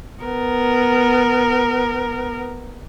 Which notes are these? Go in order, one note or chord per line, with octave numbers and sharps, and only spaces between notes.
B3 A#4